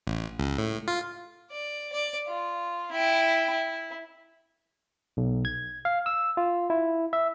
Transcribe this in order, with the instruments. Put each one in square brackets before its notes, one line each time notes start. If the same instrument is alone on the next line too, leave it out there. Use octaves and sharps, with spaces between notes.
[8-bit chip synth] A1
C#2
A2
F4
[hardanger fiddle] D5
D5
F4
E4 G5
E4
[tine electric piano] B1
G#6
F5
E6
F4
E4
E5